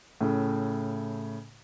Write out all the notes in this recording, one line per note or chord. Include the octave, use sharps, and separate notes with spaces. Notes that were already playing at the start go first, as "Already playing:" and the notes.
A2 C#3 A3